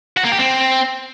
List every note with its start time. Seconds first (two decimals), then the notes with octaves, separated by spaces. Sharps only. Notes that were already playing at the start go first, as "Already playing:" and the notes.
0.17 F#4
0.24 A#3
0.32 G4
0.39 C4